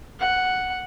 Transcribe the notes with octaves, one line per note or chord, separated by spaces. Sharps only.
F#5